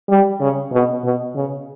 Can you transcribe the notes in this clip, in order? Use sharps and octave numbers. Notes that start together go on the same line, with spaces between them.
G3
C#3
B2
B2
C#3